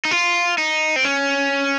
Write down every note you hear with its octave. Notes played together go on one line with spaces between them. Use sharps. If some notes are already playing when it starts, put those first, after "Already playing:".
D#4
F4
D#4
C4
C#4